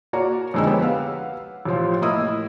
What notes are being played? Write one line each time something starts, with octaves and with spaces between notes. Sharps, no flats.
A#3 F#4 C#5 D5 A#5
F2 D3 G#3 D#4 E6
B3 G4 C#5
B4 F5 F#5
A1 C3 F3 F4
A2 A#3 E4 D#5 D#6 E6